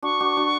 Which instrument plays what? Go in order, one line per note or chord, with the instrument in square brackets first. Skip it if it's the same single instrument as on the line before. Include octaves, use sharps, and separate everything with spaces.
[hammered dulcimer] D4 F#4 [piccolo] C#6
[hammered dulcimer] D4 F#4
D4 F#4